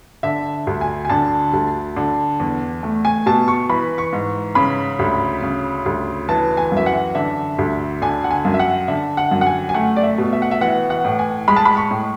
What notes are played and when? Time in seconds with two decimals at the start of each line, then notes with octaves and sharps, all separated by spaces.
0.23 D3 E5
0.67 D2
0.81 G#5
1.05 G#5
1.10 D3 A5
1.53 D2
1.96 D3
2.40 E2
2.83 A3
3.05 G#5
3.26 B2 A5
3.48 C#6
3.69 E3 B5
3.98 C#6
4.13 G#2
4.55 C#3 B5
4.99 D2
5.42 C#3
5.86 D2
6.29 E3 A5
6.57 G#5
6.72 F#2 E5
6.86 F#5
7.15 D3 E5
7.58 D2
8.02 D3 G#5
8.24 F#5
8.31 G#5
8.45 F#2
8.54 E5
8.59 F#5
8.88 D3 E5
9.17 F#5
9.31 F#2
9.41 F#5
9.46 G#5
9.69 G#5
9.74 A3 F#5
9.96 D5
10.03 E5
10.18 B2
10.33 E5
10.42 F#5
10.51 E5
10.61 E3 F#5
10.90 F#5
11.05 A2
11.19 G#5
11.48 G#3 B5
11.56 A5
11.65 B5
11.77 C#6
11.91 A2